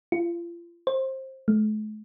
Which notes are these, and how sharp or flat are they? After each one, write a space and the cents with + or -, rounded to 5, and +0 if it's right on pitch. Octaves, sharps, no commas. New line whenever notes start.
F4 -35
C5 +20
A3 -45